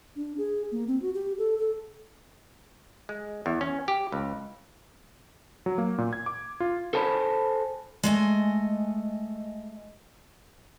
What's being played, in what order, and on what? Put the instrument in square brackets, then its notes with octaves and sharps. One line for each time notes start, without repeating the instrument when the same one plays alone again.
[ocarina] D4
G#4
A#3
C4
F#4
G4
A4
A4
[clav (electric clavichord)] G#3
E2
C#4
G4
C#2
[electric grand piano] F#3
A#3
A#2
G#6
D6
F4
[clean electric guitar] A4 C5 G#5 A5 B5
[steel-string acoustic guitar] G#3 A3 D#5 G#5